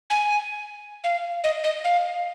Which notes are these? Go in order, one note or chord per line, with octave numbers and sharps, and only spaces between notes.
G#5
F5
D#5
D#5
F5